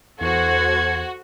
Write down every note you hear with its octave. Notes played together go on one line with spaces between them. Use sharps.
E2 F#4 A4 C5 G#6